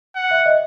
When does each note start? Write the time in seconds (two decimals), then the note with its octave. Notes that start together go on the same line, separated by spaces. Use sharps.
0.16 F#5
0.31 E5
0.46 D#5